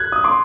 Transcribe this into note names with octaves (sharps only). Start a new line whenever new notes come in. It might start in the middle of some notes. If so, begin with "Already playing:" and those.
Already playing: F#6 G#6
D#6
C6 D6